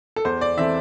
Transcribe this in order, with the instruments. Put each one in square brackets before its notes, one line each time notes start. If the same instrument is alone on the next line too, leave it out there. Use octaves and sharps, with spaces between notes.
[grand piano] A4
[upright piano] E2 [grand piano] C5
[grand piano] D5
[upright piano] E3 C4 A4 [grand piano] E5